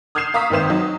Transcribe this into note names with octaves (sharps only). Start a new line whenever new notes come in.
D#6 F6 G6 G#6 C7 E7
F5 A#5 C#6 D#6 E6 B6
G#1 D#3 C4 C5 E7
F#3 D#4